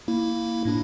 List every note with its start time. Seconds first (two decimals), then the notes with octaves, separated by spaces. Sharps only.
0.08 A#3 E4
0.65 A2 D4 E4